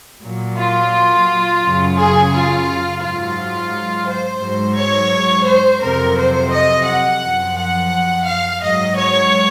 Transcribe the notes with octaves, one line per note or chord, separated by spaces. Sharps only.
A#2 F#3
F4
F#2 C#3 F#3
G#4
F4
G#2 F#3 F4
C5
G#2 F#3
C#5
C5
F2 C3 F#3 A#4
C5
D#5
F#5
F#2 F3
F#5
F5
G#2 F#3 D#5
C#5